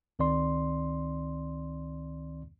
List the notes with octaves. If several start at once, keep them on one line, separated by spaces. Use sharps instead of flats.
C#2 D#3 C4 D5 C6